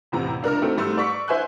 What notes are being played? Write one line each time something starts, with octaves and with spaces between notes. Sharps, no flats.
A1 E2 A2 C3 A#5
C#2 D4 A#4 F6
A3 C4 D#4 F#4 A4
G#2 G3 A3 C6 E6
D5 C#6 B6
E4 C5 E5 G#5 C6 F#6